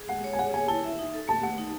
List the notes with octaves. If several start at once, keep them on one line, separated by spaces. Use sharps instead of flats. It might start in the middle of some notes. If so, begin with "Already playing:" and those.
Already playing: G#4
G#3 F#5
C#5
G#5
G#4 F#5
C#5 G#5
E4 A5
E5
D#4
A4
A3 A5
A3 F#5
D#4